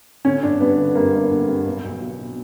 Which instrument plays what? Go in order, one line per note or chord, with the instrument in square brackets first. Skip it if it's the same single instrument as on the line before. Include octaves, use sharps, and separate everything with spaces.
[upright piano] D3 C#4
G1 D4
G2 B3
D3
G2 A#3
G1
D3
G2
B1
B1
B2
B2